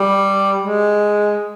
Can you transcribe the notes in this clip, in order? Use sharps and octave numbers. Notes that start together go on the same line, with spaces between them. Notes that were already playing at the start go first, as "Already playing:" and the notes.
Already playing: G3
G#3